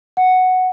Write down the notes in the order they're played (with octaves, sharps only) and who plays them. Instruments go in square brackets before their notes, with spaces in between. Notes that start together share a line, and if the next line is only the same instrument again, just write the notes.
[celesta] F#5